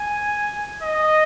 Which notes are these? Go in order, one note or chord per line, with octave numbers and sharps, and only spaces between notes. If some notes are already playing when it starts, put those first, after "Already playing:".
Already playing: G#5
D#5